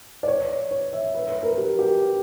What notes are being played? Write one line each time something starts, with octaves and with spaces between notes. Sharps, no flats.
D5
C#5
C#5
E5
B4
B4
A#4
G4
G4